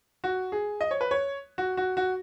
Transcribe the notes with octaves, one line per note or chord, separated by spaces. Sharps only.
F#4
G#4
D#5
C#5
B4
C#5
F#4
F#4
F#4